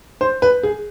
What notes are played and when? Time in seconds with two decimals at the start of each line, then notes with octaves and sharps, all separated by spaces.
0.21 C5
0.42 B4
0.63 G#4